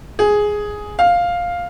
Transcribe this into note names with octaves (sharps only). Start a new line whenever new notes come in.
G#4
F5